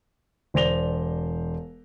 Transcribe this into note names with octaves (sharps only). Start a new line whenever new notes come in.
E1 C5 D5 A#6 F7 G7